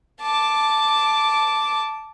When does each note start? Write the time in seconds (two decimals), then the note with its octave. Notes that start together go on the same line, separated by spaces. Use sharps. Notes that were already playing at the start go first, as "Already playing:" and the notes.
0.21 A5 D6